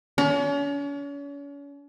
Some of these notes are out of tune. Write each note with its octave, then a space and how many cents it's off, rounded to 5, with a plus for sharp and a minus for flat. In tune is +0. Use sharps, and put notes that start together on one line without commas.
C#4 +40